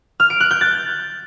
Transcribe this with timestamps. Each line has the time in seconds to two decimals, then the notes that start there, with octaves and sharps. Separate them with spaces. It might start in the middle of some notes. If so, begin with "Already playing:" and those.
0.20 F6
0.30 D7
0.40 F#6
0.51 G6
0.61 A6